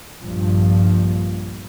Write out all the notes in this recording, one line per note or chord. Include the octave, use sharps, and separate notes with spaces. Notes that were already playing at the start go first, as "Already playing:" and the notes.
A#1 G2 F3